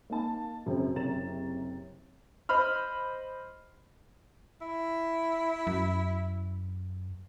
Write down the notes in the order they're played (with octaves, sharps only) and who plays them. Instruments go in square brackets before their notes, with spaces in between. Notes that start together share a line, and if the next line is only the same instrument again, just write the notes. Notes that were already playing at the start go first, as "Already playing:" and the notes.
[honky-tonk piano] A#3 D#4 A5
F#2 C#3 C4
F#1 C3 C#4 A#5 A6 E7
[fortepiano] C5 D#5 B5 F6
[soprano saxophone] E4
[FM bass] F#2